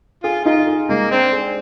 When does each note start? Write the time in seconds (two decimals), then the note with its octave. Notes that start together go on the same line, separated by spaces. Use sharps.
0.23 F4 G#4
0.45 D#4 F4
0.67 G#4
0.89 G#3 A#3
1.11 C4 D4
1.32 G#4